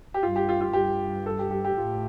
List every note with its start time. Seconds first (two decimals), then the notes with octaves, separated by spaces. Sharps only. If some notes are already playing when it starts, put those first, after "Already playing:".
0.14 G4
0.23 G2 F4
0.36 G4
0.49 F4
0.61 F4
0.73 G2 G4
1.26 A4
1.39 G4
1.51 G4
1.65 G4
1.77 A2 F4